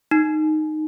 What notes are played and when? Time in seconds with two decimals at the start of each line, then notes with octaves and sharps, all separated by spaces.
0.11 D#4